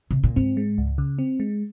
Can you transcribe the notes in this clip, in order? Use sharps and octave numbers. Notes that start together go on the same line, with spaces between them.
C3
A#2
G#2 C4
G#3
C#2
C#3
C4
G#3